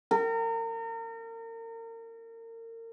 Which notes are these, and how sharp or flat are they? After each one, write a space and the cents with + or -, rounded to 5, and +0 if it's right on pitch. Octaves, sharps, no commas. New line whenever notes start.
A#4 -35